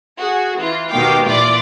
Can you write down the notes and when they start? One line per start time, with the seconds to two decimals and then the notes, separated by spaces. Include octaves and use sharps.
0.17 F#4 G#4
0.58 E3 F4
0.90 D#2 B2 D#3 F5 G5 D6
1.26 A#2 E3 F4 D5 D6